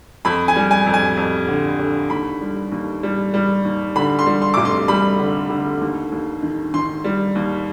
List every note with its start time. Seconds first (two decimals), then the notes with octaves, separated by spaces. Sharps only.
0.25 F2 B5
0.48 G#5
0.56 G3
0.71 G#5
0.86 F2
0.94 G#5
1.17 F2
1.48 D3
1.79 D3
2.10 D#2 B5
2.41 G3
2.72 D#2
3.03 G3
3.34 G3
3.65 D#2
3.96 D3 B5
4.19 C6
4.26 G3
4.42 C6
4.54 F1 D6
4.65 C6
4.88 G3 B5
5.19 D3
5.50 D3
5.81 D#2
6.12 D#2
6.42 D#3
6.74 D#3 C6
7.04 G3
7.35 D#2